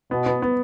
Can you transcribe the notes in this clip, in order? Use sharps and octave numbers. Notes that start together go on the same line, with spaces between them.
B2 B3
B3
B3